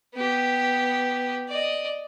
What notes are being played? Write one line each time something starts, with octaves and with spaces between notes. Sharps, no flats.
B3 G4
D5 D#5